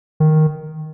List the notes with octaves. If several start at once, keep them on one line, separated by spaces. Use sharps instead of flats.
D#3